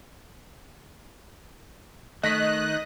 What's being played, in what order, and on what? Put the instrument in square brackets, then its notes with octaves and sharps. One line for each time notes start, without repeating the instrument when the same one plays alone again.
[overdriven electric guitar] D#3 [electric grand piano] A3 A#6 B6 [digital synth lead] D#5 [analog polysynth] F#6